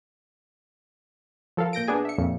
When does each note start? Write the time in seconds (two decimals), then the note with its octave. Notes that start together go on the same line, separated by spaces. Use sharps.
1.57 F3 A4 A#4 F5
1.73 A#2 G6 A#6 D7
1.88 B3 D4 G#4 G#5
2.05 E5 C#7
2.18 F2 A#2 F3